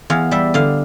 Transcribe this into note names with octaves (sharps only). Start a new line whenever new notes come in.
E2 F5
G3 E5
D3 F5